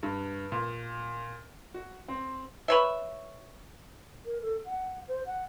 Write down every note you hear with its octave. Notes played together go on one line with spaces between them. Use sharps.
G2
A#2
F#4
C4
B4 C#5 E5
A#4
A4
F#5
C5
F#5